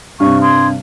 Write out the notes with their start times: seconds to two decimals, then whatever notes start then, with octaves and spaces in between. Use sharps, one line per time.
0.20 G2 C3 C#6
0.42 C6 D#6 G#6